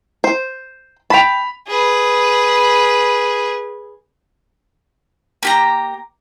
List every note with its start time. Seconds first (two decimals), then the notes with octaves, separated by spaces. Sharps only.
0.24 C5
1.10 G5 A5 B5 B6 F7
1.68 G#4 B4
5.43 A#3 G4 A#5